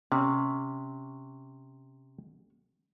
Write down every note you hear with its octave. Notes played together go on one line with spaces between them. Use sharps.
C3 C#4